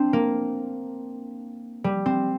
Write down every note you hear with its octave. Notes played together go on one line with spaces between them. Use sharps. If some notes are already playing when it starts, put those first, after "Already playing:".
Already playing: C4 D4
A#3
G3
C4